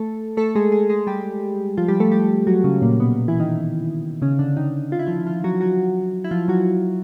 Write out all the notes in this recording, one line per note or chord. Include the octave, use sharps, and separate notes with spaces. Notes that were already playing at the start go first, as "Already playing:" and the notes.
Already playing: A3 A4
A3 A4
G#3 G#4
G#3 G#4
G#3 G#4
G3 G4
F3 F4
G3 G4
A3 A4
G3 G4
F#3 F#4
C#3 C#4
A#2 A#3
B2 B3
E3 E4
D#3 D#4
C#3 C#4
D3 D4
D#3 D#4
F4
E4
F3 F4
F3 F4
F#3 F#4
F#3 F#4
E4
F3 F4
F#3 F#4